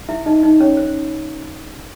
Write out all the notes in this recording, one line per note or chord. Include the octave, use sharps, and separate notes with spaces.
E4 E5
D#4 D#5
D#4 D#5
C#4 C#5
C5